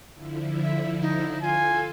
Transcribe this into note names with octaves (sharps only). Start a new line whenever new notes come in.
D3 F3 E4
E5
D#4
F4 A4 G#5